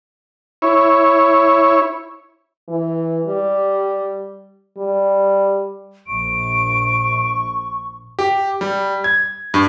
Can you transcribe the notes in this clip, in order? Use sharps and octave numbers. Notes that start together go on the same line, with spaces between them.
E4 C#5
E3
G3
G3
A#1 C#6 D7
G4
G3
G#6
G2